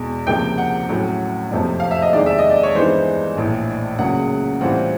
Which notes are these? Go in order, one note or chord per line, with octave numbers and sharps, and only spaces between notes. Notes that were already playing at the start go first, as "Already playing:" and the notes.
Already playing: E2 B2 G#3
C#2 C3 F3 A#3 G5
F#5
A2 F#3 A3 C#4
F#1 F2 C3 F3
F5
E5
D#5
E2 C3 D#3 G#3 D5
E5
D#5
D5
C#5
G2 E3 G#3 B3 D#4 C5
A#1 A2 E3
C#2 C#3 F#3 A#3 F#5
A2 E3 G3 C4 F4 F#5